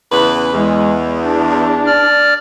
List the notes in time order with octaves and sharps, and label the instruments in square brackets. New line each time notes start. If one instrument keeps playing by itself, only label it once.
[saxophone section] E2 C#3 B4
[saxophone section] E2 [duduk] G#3
[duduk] D4
[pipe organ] D5 F6